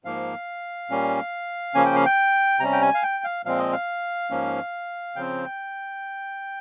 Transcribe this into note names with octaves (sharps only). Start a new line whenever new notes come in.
G#2 F3 A#3 F5
A#2 G3 A#3 C#4
C#3 F3 A#3 C#4 G#5
G5
F5
G5
C3 G3 C#4 A#5
G5
G#5
F5
G5
F5
A#2 F3 G#3 C4 F5
D#5
F5
G#2 F3 A#3 C#4
C#3 F3 C4 G5